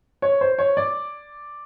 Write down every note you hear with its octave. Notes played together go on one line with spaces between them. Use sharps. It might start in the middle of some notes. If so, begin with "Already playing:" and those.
C#5
C5
C#5
D5